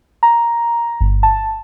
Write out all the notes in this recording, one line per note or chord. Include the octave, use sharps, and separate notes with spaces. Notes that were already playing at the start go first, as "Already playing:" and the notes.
A#5
G1
A5